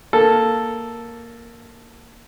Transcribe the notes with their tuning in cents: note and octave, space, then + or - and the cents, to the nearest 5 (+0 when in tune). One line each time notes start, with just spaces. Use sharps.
A#3 +0 A4 +0